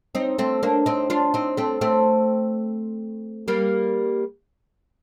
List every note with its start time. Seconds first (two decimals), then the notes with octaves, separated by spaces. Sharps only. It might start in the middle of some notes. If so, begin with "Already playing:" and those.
0.15 C4 D#4
0.38 A3 C4
0.63 A#3 D4
0.86 C4 D#4
1.10 D4 F4
1.34 C4 D#4
1.57 A3 C4
1.81 A3 C4
3.48 G3 A#3